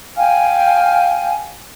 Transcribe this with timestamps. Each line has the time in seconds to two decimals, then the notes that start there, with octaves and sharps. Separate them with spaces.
0.16 F5 G5 G#5 F6